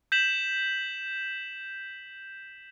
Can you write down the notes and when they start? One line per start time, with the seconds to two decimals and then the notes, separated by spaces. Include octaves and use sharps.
0.12 G6 B6 E7 F#7